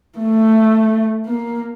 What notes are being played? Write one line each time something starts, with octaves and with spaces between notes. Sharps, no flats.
A3
A#3